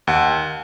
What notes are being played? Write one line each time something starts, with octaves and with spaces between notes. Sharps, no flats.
D#2 F#5